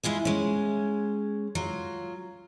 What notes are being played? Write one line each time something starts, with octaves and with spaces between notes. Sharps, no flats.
G#3 E4 F4 G#4
G#3 C#4
F#3 F4